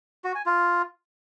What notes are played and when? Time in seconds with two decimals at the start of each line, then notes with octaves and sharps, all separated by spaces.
0.24 F#4
0.35 G#5
0.46 F4